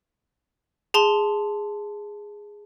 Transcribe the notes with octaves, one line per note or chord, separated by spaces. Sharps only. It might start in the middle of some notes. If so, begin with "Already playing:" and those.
G#4 A5 C6 G7